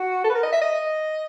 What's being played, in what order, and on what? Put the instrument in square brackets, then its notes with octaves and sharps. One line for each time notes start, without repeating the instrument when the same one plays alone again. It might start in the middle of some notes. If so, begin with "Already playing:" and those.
Already playing: [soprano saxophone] F#4
A4
B4
A#4
D#5
E5
D#5